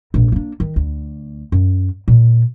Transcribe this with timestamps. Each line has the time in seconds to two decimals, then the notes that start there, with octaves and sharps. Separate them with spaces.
0.14 A#1 G#2
0.32 A#3 D4
0.60 D#3
0.76 D2
1.52 F#2
2.08 A#2